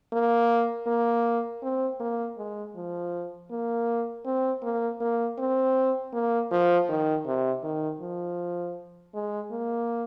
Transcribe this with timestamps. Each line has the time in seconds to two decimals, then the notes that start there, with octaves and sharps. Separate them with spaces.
0.13 A#3
0.87 A#3
1.63 C4
2.00 A#3
2.38 G#3
2.75 F3
3.51 A#3
4.25 C4
4.63 A#3
5.00 A#3
5.39 C4
6.13 A#3
6.51 F3
6.89 D#3
7.26 C3
7.63 D#3
8.01 F3
9.14 G#3
9.51 A#3